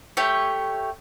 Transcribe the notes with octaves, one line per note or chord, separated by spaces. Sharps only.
A3 G4 C#5 G6